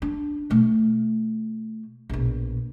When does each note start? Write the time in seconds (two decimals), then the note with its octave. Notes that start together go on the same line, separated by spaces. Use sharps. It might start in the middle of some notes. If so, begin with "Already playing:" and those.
0.02 D4
0.50 B2 A3
2.09 A#1 B2